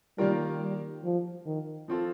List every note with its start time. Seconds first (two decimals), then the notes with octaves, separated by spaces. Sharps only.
0.18 D#3 G3 A#3 F4 A#4
0.61 G3
1.04 F3
1.46 D#3
1.88 F3 C4 F4 A4